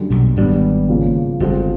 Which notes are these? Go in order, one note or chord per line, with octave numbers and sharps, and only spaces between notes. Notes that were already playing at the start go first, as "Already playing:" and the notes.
Already playing: F#2 D3 G3
B1 B2
G#1 G#2 G3 B3 D4
C#3 F3 A#3 C#4
G1 G2 F3 G#3 C4 F4 A4